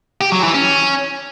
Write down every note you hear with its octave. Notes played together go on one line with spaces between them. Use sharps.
G4
F#3
E3
C#4